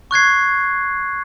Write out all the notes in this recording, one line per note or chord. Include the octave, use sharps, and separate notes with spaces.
C#6 F#6 G#6 C7